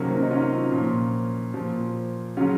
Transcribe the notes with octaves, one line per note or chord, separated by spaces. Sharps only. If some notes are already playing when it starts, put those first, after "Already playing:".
Already playing: C3 D#3 F#3 A#3 C#4
C4
C#4
D#4
C#4 F4
A#2 F3
A#2 F3
C#3 F#3 C#4 F4